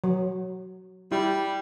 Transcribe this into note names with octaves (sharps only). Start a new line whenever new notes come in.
F#3
G3 E4